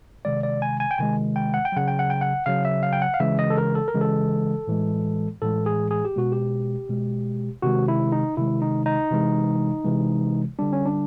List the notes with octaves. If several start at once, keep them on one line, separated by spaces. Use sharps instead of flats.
C3 D#3 G#3 D5
D5
G#5
G#5
G5
C3 D#3 G#3 G#5
G5
F#5
G5
C#3 F#3 F#5
G5
F#5
G5
F#5
C#3 F#3 F5
E5
F5
G5
F#5
F5
C#3 E3 G#3 E5
D#5
A4
A#4
A4
A#4
C#3 E3 G#3
A4
A2 E3 G#3
A2 E3 G#3 A4
G#4
G#4
G4
B2 G#3 F#4
G4
B2 G#3
C3 D#3 G#3 F#4
E4
D#4
C3 D#3 G#3 E4
D#4
D#4
C3 E3 G#3
C3 E3 G#3
D3 G3 D4
C#4
D4